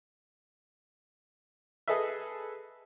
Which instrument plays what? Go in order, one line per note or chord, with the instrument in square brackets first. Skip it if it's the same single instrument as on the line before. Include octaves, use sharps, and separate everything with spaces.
[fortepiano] G#4 A4 B4 D#5 E5